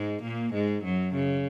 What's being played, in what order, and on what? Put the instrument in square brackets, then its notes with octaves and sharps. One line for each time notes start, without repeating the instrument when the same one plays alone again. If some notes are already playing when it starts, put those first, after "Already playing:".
Already playing: [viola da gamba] G#2 G#3
A#2 A#3
G#2 G#3
F#2 F#3
C#3